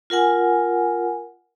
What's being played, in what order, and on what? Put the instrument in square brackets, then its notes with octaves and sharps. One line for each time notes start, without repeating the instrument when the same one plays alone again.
[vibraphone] F4 A#4 F#5 G#5